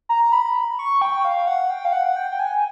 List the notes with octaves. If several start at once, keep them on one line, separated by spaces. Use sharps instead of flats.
A#5
B5
C#6
G5
F5
F#5
G5
F5
F#5
G5
G5
G#5